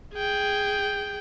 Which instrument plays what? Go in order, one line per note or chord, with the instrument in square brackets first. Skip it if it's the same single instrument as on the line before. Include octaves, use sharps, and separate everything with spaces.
[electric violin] G#4 G5